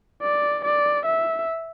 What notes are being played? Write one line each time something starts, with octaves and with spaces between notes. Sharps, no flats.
D5
D5
E5